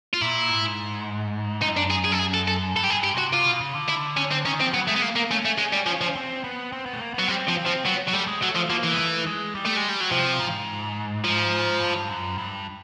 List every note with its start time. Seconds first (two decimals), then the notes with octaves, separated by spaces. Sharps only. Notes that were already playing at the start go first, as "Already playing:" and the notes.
0.13 F4
0.21 A#2 E4
0.50 G#2
1.62 F#2 D#4
1.77 D4
1.91 G#4
2.05 G#4
2.12 A4
2.19 G#4
2.34 A4
2.48 A4
2.76 G2 A4
2.84 G4
2.90 G#4
2.95 G2
3.04 G4
3.14 C3 F#4
3.33 C3 F4
3.47 B2
3.61 C#3
3.75 D3
3.88 E4
4.17 C#4
4.31 C4
4.45 D#3 C#4
4.59 F3 C4
4.74 F#3 B3
4.87 G#3 A3
4.96 B3
5.02 A#3
5.16 A#3
5.31 A3 C#4
5.45 A3
5.58 G#3
5.73 G3
5.86 F3
6.01 F3
6.15 C4
6.44 B3
6.72 C4
6.86 B3
6.93 A3
7.01 A#3
7.14 F#3 B3
7.28 G3 C4
7.48 F3
7.57 C4
7.66 F3
7.85 F#3 B3
8.07 F#3
8.13 G3 A3
8.28 G#3
8.42 F#3 A3
8.55 F3
8.70 F3 A#3
8.84 E3
8.94 G#3
8.99 A3
9.26 G#3
9.55 G3
9.65 A3
9.77 G#3
9.89 G3
10.00 F#3
10.11 C3 F3
10.40 G#2
11.24 F3
11.81 G2
12.09 F#2
12.38 G2